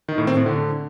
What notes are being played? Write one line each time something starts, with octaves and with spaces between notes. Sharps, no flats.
D#3
A2
C4
A2
D3